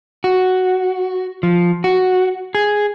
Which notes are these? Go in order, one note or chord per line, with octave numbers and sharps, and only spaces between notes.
F#4
F3
F#4
G#4